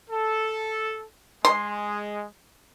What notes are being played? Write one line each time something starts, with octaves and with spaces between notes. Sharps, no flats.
A4
G#3 C6